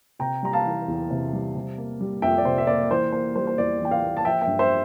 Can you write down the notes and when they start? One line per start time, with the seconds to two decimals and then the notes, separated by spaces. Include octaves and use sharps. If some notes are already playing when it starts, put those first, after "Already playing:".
0.19 C3 G5 A#5
0.43 G3 A#5
0.53 F5 A5
0.66 E3
0.88 E2
1.11 C3
1.33 G3
1.55 C3
1.78 A#3
2.01 G3
2.22 F2 E5 G5
2.38 D5
2.45 C3 C5
2.58 E5
2.67 A#3 D5
2.91 E3 C5
3.12 A#3 C5
3.35 G3 C5
3.47 C5
3.58 E2 D5
3.80 E3 G5
3.91 D5 F5
4.03 A#3
4.17 A5
4.25 F3 E5 G5
4.42 E5 G5
4.47 G2
4.59 C5 E5